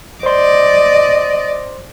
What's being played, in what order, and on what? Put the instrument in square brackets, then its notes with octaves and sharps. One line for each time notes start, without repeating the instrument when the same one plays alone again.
[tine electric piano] C5 C6 [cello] D5 D#5